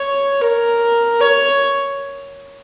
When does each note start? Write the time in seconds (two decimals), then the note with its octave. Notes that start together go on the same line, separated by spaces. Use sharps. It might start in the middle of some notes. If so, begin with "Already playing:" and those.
Already playing: C#5
0.41 A#4
1.21 C#5